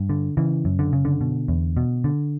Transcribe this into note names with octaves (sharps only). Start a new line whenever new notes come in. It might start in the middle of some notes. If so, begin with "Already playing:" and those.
Already playing: G2
D3
C#3 E3
F#2
D3
C#3
D3
B2
E2
B2
D3